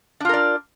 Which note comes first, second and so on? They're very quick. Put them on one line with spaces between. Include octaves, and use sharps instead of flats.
D4 F4 A#4 D5